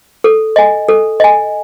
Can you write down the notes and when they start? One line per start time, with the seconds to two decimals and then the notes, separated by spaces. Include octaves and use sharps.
0.24 A4
0.56 D#5 G#5
0.89 A4
1.20 D#5 G#5